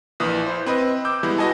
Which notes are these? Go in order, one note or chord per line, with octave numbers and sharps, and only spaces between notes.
A#1 A#2 E3 D#6
E4 C5
C4 B4 D#5
D6 E6 G6
E3 G3 G#3 B3 E4
F#4 B4 D#5 G#5 A5